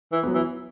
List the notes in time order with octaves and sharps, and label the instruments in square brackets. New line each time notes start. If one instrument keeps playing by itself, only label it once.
[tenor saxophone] E3
[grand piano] F#3 B3
[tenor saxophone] E3